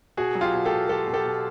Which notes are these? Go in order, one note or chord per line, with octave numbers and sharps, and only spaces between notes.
B2 F#4 G#4
F#3
F4 G4
B2
G4 A4
B2
F#3 G4 A4
B2
G4 A4
B2